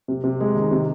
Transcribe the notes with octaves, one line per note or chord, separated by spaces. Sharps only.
C3
C3
G#3
D#3
C3